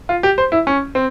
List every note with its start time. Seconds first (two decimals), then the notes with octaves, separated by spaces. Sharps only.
0.09 F4
0.23 G4
0.38 C5
0.52 E4
0.67 C#4
0.95 C4